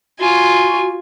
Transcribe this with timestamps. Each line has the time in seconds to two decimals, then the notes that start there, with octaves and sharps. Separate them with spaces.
0.20 F4 F#4 G#5